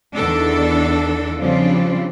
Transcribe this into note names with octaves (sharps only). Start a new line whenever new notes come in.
E2 D#3 D4 A4
C#3 F3 G3 C4 D4 F4